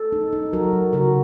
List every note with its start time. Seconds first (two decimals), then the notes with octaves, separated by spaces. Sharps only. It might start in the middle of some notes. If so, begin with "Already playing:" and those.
Already playing: A4
0.12 D#4
0.33 D#4
0.53 F#3 F#4 A#4
0.73 F#3
0.93 C#3 F#4 A#4